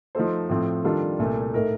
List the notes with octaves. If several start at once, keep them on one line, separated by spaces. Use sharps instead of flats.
F3 A3 D#4 A4 C5
A2 F3 C4
D#3 G3 D4 F4 A4
C2 A#2 A3
A2 A3 D#4 A#4